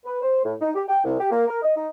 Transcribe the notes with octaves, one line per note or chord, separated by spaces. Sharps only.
B4
C5
A2
D#4
G4
G5
C2
G4
A#3
A#4
D#5
D#4